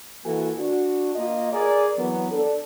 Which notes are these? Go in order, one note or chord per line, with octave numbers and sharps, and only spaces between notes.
E3 A#3 F#4 A4 G#5
D4 F#4
A#3 F4 D#5
G#4 A#4 D5
E3 F#3 B3
D4 A4